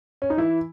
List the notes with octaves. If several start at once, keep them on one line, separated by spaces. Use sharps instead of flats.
C#4
D#4
E3 E4